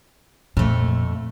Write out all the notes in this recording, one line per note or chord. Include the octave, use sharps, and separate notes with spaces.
F2 A#2 A3